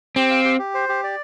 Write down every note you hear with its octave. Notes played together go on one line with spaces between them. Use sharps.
C4 G4
F5
G4
G4
C5
G4
D5